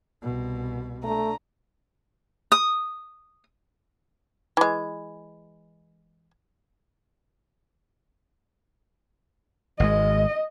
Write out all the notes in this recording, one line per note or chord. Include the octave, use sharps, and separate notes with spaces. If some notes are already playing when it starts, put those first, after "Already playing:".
C2 B2
A3 D4 A#5
D#6
E3 G#3
G#1 G#3 D#5